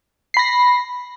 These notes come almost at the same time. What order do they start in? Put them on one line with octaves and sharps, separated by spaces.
C7 B5 A#6